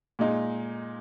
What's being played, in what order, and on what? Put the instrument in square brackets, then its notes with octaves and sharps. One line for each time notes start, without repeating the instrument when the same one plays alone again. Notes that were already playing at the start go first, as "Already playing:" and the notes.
[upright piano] A#2 G#3 D#4